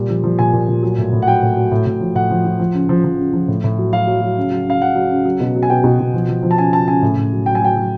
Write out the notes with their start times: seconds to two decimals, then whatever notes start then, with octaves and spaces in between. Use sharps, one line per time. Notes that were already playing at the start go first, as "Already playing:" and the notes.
Already playing: A#2 G3
0.09 F3
0.24 F3
0.39 A#2 G#5
0.53 A#2
0.68 A#2
0.83 F#3
0.98 A2
1.12 A2
1.22 F#5
1.27 F#3 G5
1.42 A2
1.57 F#3
1.71 A2
1.86 A2
2.00 F3
2.15 A2 F#5
2.31 F3
2.45 F3
2.59 F3
2.74 C#3
2.89 F3
3.04 F3
3.19 C#3
3.33 F3
3.48 A2
3.64 A2
3.78 F#3
3.93 F#3 F5
4.07 F#3
4.22 F#3
4.37 C#3
4.51 F#3
4.66 C#3 F5
4.82 C#3 F#5
4.95 F#3
5.10 C#3
5.25 F#3
5.40 B2
5.56 F#3
5.63 G#5
5.70 B2 G5
5.84 B2
5.99 B2
6.14 F3
6.29 F3
6.43 F3
6.51 A5
6.58 C#3 G#5
6.73 C#3 A5
6.88 C#3 G#5
7.02 A2
7.17 A2
7.33 F#3
7.46 F#3 G5
7.55 G#5
7.61 F#3 G5
7.76 F#3